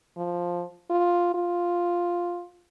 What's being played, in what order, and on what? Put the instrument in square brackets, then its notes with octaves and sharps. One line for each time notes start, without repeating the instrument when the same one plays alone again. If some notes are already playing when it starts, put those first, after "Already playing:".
[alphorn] F3
F4
F4